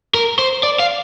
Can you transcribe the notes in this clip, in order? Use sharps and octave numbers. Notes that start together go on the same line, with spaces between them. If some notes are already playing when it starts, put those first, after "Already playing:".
A#4
C5
D5
F5